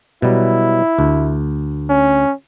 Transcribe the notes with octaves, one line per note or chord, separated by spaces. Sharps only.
B2 F#3 G3 E4
D2
C#4